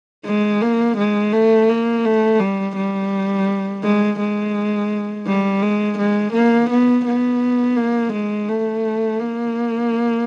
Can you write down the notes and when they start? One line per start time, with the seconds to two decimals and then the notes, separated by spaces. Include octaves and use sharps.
0.25 G#3
0.62 A#3
0.98 G#3
1.33 A3
1.69 A#3
2.05 A3
2.40 G3
2.77 G3
3.83 G#3
4.19 G#3
5.27 G3
5.63 G#3
5.99 G#3
6.34 A#3
6.70 B3
7.05 B3
7.77 A#3
8.13 G#3
8.49 A3
9.20 A#3